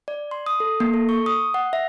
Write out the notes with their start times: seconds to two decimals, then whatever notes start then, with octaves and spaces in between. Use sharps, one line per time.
0.08 D5
0.31 C6
0.46 D#6
0.60 A4
0.80 A#3
0.94 A4
1.09 C#6
1.26 D#6
1.54 F#5
1.73 E5